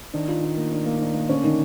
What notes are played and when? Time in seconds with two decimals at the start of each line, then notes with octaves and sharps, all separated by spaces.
0.14 D#3 D4
0.28 F4
0.43 D4
0.57 A#3
0.72 D4
0.86 A#3
1.00 D4
1.14 A#3
1.29 D3 C#4
1.44 D#3